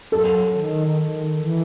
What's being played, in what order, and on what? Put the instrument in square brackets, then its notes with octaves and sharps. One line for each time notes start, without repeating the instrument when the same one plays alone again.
[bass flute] F#3 [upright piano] A4
[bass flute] D#3
D#3
E3